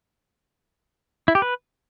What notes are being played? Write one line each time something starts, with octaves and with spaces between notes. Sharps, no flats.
E4
G4
B4